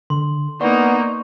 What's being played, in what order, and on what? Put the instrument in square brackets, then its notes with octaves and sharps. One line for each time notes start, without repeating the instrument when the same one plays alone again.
[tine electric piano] D3 [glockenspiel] C6
[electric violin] A#3 D#4 [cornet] B3 [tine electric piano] D5 [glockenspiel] C#6